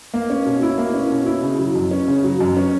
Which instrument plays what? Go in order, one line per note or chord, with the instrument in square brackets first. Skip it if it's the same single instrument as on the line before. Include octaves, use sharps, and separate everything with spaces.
[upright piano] A#3
C#4
B2
E4
A#3
C#4
B2
E4
C#3
F#3
F#2
C#4
C#3
F#3
F#2
C#4